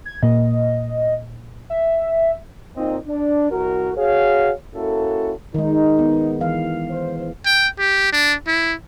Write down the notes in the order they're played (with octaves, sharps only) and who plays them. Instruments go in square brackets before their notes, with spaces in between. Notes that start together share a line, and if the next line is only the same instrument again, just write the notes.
[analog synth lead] G#6
[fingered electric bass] A#2 A#3 [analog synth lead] D#5
[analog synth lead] E5
[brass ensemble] A#2 C4 D#4 D#5
D4
C2 F#4 A#4
F#4 G#4 C#5 F5
A#3 C#4 E4 F#4 A4
[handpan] D#3 G#3 [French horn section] D#4
[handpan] B3
E3 F5
[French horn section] C5
[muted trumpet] G5
G4
D4
E4